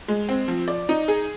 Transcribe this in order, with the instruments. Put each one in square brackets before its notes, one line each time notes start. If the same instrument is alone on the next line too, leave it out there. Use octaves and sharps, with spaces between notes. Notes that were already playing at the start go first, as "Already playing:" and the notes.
[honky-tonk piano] G#3
C4
F3
D5
D#4
G#4